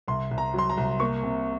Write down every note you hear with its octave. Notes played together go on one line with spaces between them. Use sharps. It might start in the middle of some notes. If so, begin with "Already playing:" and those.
C2 C6
C2
A#5
F#3 C6
A#5
C2
A#3 C#6
C3